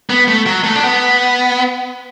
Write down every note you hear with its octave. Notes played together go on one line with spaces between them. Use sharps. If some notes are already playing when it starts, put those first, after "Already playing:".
B3
A3
F#3
A3
D4
B3